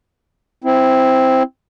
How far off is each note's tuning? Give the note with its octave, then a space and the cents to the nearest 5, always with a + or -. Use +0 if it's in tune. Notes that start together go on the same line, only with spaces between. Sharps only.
C4 +0 E4 +0